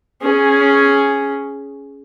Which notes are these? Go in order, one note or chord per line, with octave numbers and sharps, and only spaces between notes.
C#4 G#4